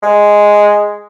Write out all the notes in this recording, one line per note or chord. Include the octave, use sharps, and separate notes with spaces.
G#3